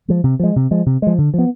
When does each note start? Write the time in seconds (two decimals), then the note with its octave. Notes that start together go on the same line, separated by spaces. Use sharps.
0.08 F3 G#3
0.24 C3
0.40 F3 G#3
0.56 C3
0.71 F3 G#3
0.86 C3
1.02 F3 G#3
1.18 D3
1.34 F3 B3